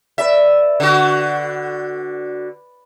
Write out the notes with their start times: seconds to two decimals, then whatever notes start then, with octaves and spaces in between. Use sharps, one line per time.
0.18 B4 D5 E5
0.80 D3 F#4